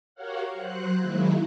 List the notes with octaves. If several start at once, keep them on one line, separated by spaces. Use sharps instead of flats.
F#4 G4 A#4 C#5 F5 F#5
F#3 C5 F#6
D#3 F#3 G#3 A#3 E4